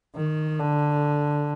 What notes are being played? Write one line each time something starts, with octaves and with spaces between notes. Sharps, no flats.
D#3
D3